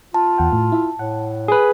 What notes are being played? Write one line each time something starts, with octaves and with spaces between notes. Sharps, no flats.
F4 A5
E2 F#5 G5
A2
E4 E5
A2 F#5
G#4 B4